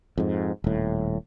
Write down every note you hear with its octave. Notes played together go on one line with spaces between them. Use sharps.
F2 G#2
D#1 A2